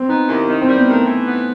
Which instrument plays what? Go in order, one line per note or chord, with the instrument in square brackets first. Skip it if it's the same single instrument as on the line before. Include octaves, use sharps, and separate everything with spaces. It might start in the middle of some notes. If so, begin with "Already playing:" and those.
Already playing: [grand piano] C4
[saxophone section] B3 [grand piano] D#4
[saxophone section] D#2 [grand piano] E4
[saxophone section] D#3 [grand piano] C4
[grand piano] C4
[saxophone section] G3
[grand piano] B3
[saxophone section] D#3 [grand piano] A3
[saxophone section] E3
B3